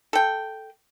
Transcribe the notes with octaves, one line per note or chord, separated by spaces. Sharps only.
A4 G5